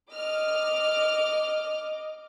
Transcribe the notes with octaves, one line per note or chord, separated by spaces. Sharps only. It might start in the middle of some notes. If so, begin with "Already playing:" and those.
D#5 D6 F6